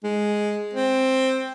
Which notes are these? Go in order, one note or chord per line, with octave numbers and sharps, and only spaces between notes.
G#3
C4